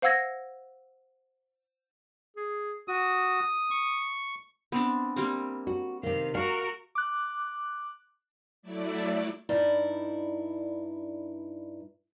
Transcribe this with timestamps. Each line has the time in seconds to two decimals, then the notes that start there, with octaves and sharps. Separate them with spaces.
0.02 C5 F5 F#5 E6 G#6 A#6
2.37 G#4
2.88 F#4 D#6
3.71 C#6
4.72 B3 C4 D4
5.16 G3 A#3 C4
5.67 F#4
6.03 C3 D#3 F5
6.35 F#4 A#4 F5
6.95 D6 F#6
8.62 F#3 A3 E4 D5
9.49 G2 D#4 E4 D5